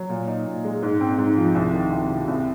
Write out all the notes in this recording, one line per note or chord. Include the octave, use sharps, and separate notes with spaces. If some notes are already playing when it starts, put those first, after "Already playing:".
Already playing: F#3
A#2
D#4
A#2
G#3
G#2
C4
G#2
F3
C2
D#3
C2
C3
C2